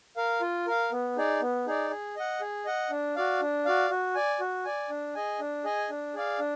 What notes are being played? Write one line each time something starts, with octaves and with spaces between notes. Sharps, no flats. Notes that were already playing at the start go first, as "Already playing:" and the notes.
A#4 F5
F4
A#4 F5
B3
D#4 G#4 D5
B3
D#4 G#4 D5
G#4
D#5 F#5
G#4
D#5 F#5
D4
F#4 D5 F5
D4
F#4 D5 F5
F#4
D5 G#5
F#4
D5 G#5
D4
G#4 D#5 G#5
D4
G#4 D#5 G#5
D4
G#4 D5 F5
D4